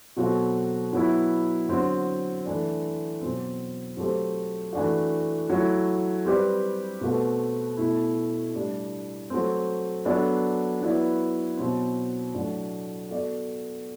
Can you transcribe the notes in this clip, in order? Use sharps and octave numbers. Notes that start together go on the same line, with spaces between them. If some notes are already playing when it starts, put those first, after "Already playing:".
B2 F#3 C4 F#4 A4
F#3 B3 E4
D3 F#3 C4
E3 A3 D4
B2 F#3 C4
F#3 A3 C4 G4 C5
E3 A3 D4 F#4
F#3 A3 E4
G3 C4 G4 B4 D5
B2 A3 C4 F#4 B4
B2 A3 E4
A2 G3 D4
F#3 A3 C4
F#3 B3 D4 A4 D5
F#3 B3 E4 B4 D5
B2 F#3 C4
A2 F#3 A3 D4
B3 F#4 A4 D5